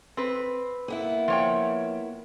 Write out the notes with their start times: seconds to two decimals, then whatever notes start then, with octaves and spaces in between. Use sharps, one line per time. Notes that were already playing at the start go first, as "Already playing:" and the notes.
0.17 C4 B4
0.88 A#3 B3 E4
1.28 F3 C#5 G5